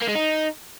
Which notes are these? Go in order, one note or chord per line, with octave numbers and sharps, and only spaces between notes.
A#3
G#3
D#4